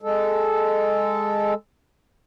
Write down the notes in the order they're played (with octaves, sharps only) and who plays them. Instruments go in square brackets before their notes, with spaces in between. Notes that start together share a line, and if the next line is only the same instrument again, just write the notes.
[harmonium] G#3 A4